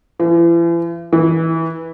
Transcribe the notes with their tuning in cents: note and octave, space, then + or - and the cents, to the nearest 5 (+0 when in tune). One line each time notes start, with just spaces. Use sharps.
E3 +40
E3 -20